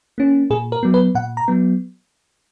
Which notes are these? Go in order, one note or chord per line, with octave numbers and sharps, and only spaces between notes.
A#3 C#4
A#2 G#4
A#4
F#3 B3
B4
A#2 F#5
A#5
F#3 B3